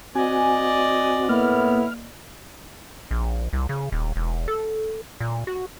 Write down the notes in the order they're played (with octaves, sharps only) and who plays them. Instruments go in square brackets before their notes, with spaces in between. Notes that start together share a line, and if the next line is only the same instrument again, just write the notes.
[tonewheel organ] C4 F#4 [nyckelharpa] D5 D#5 [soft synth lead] G#5
[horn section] A2 B3 E4 [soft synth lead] A#3 [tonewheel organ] F6
[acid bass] A#1
C2
C#3
D#1
E1
A4
A#2
F#4